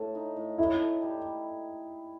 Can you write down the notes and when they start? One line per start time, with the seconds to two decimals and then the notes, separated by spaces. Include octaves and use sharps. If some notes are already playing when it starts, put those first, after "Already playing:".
Already playing: A2 A4
0.15 D#4
0.36 A2
0.58 A2 E4
0.80 A4
1.02 G3